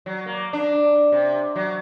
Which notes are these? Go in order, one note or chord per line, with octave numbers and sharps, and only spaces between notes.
F#3
A#3
D4
C3
F#3